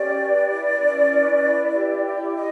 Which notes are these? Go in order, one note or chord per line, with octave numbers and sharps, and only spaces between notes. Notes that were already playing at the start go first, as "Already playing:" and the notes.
Already playing: C#4 G4 D5
B4
E4
C#4
B4
E4
G4
E4
D#5